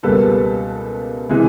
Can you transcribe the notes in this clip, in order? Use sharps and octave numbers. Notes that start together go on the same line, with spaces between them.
C#2 B2 G3 A#3 A4 B4
C3 E3 G#3